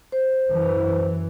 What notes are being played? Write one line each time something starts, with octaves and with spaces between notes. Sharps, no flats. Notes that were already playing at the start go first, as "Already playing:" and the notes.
C5
F#2 E3